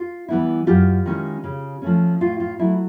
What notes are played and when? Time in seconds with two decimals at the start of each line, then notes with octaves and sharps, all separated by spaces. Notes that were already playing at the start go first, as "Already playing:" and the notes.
Already playing: F4
0.28 E3 G3 B3 E4
0.67 F#2 F4 G4
1.06 D#3 G#3 C#4 E4
1.44 C#3
1.82 F3 A3 C#4
2.21 A2 F4
2.40 F4
2.59 F#3 A3 E4